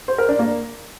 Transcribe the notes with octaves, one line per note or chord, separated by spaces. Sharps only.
C5
A#4
D4
A#3